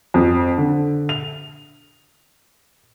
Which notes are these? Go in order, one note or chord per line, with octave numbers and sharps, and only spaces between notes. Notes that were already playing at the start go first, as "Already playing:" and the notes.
F2
D3
F7